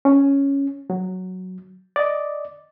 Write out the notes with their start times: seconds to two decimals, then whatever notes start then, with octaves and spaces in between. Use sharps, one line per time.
0.05 C#4
0.90 F#3
1.96 D5 D#5